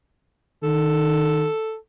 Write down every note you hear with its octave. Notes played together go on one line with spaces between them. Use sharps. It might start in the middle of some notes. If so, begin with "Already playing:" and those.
D#3 A4